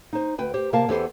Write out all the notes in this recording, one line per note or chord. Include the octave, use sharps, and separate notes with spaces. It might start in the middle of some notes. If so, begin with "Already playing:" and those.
D#4 C5
D2 B4 G5
G4 C5
C3 A#3 A#4 F5 A5
E2 B3 G4 A4 C5